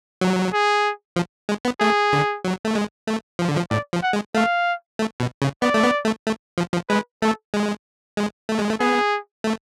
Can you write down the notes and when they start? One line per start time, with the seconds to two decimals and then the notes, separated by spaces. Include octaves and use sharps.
0.21 F#3
0.53 G#4
1.16 F3
1.49 G#3
1.65 B3
1.80 A3 G#4
2.13 D3
2.45 F#3
2.65 A3
2.75 G#3
3.07 A3
3.39 F3
3.49 D3
3.57 F3
3.71 A2 D5
3.93 F3
4.03 F#5
4.13 G#3
4.35 A3 F5
4.99 A3
5.20 B2
5.42 C#3
5.62 B3 D5
5.74 A3
5.84 B3
6.05 A3
6.27 A3
6.58 F3
6.74 F3
6.89 G#3 B4
7.22 A3 A4
7.54 G#3
8.17 G#3
8.49 A3
8.59 G#3
8.70 A3
8.80 B3 G#4
9.44 A3